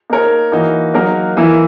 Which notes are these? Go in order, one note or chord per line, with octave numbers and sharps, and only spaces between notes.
A#3 D#4 A#4 C#5
E3 A#3 D#4 F#4
F#3 A#3 D#4 F#4 A#4
E3 A#3 E4